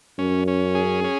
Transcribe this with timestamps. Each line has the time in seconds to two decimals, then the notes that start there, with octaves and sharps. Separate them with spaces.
0.18 F#2 C#4
0.48 C#4
0.75 G#4
1.04 C#4